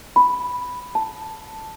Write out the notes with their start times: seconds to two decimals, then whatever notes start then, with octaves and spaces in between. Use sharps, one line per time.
0.16 B5
0.95 A5